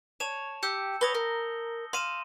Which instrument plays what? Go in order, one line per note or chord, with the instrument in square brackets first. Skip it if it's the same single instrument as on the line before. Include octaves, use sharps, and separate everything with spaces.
[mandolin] C#5 [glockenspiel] A5 E7
[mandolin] G4 [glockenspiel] E6 G6 C#7
[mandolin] B4 C#5 [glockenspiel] D#6 A#6 G7
[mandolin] A#4
[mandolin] F5 [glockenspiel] C6 D#7 E7